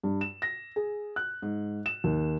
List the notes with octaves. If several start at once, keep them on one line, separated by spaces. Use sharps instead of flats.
G2
E7
A#6
G#4
F#6
G#2
E7
D#2